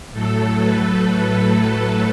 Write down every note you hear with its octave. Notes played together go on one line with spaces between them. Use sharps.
A2 F#3 A3 A4
B4